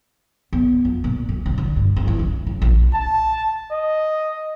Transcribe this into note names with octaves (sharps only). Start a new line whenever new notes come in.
B3
F2
A#2
D2
C3
D3
G2
G#1
E3
C#4
C#3
A#1
A5
D#5